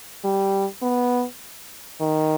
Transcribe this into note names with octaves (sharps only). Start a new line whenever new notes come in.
G3
B3
D#3